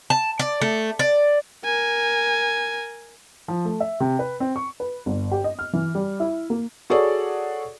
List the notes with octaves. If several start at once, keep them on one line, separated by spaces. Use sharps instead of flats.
A5
D5
A3
D5
A#4 G#5
F3
A3
E5
C3
B4
C4
C#6
B4
G1
G4
D#5
F6
E3
G3
E4
A#3
F#4 G#4 A4 C#5 D5